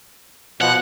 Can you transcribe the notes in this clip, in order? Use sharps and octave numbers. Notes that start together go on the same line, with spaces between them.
B2 F3 F#5 F#6